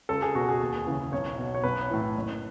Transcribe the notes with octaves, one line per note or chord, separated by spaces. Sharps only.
C#2 A4
G#4
B2 F#4
G#4
D#2
C#3 E3
B1 C#5
B2
C#5
B1 B4
A2 E3
F#1